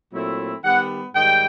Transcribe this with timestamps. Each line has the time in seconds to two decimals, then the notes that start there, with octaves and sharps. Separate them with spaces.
0.13 A#2 F#3 A3 C4 E4
0.63 D#3 G3 B3 F#5
1.14 G#2 D#3 G3 G5